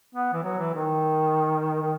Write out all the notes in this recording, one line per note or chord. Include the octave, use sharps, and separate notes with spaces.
B3
E3
F#3
E3
D#3
D#3